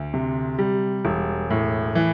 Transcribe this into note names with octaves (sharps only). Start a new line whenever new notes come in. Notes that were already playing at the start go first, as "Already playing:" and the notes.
Already playing: D2
C3
G3
E1
A2
E3